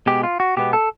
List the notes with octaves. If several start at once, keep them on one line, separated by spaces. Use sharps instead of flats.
B2 G#3 B3 G4
F4
F#4
B2 G#3 B3 G4
A4